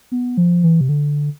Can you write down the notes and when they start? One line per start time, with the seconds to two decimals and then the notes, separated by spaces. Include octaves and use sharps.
0.12 B3
0.37 F3
0.64 E3
0.81 C3
0.89 D3